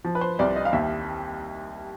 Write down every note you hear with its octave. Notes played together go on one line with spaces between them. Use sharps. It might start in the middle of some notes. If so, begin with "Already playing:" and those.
F3
B4
C5
C2 D5
D#5
F5
D#2 E5